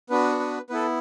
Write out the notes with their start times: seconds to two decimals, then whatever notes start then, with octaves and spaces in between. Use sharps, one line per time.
0.10 B3 D4 F#4 B4
0.40 B4
0.70 B3 E4 A4 B4